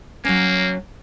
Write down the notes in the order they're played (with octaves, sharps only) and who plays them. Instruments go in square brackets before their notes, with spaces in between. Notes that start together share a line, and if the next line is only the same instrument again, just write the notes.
[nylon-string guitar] F#3 C#4 [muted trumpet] A#3